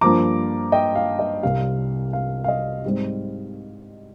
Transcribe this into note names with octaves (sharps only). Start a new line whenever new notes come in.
G2 F3 A#3 A#5 D6
D#5 G5
F5
D#5
C2 C3 G3 F5
F5
F5
D#5
G#2 G3 C4